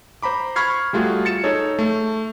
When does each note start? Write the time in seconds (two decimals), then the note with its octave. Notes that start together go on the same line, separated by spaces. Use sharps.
0.23 C5 A#5 B5 D6
0.56 B5 C#6 F6 G#6 C7
0.93 G3 A3 F4 F#4 G#4
1.25 A6 C#7 E7
1.44 D#4 G#4 A4 C#5
1.79 A3